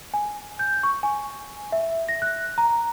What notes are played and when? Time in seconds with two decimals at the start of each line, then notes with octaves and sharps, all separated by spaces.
0.14 G#5
0.59 G6
0.83 C#6
1.03 G#5
1.72 E5
2.09 A#6
2.22 F#6
2.58 A#5